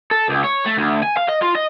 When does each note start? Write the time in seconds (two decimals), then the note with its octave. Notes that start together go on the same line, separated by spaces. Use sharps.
0.11 A4
0.29 C#2
0.44 C#5
0.66 A3
0.78 D2
1.03 G#5
1.17 F5
1.29 D#5
1.42 F4
1.55 D#5